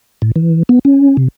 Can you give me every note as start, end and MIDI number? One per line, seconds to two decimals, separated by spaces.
0.22 0.31 45
0.36 0.63 52
0.69 0.79 59
0.85 1.17 61
1.17 1.28 48